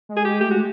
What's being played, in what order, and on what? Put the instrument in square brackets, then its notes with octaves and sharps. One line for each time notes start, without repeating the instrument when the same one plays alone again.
[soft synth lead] G#3
[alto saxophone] G#4
G4
[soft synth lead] A3 [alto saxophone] G4
[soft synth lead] G#3 [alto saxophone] F#4